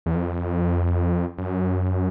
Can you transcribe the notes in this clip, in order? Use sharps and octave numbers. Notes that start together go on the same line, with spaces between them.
E2
F2
F#2